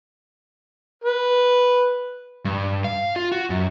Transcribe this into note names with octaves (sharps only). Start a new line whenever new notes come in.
B4
G2
F5
F4
F#4
F#2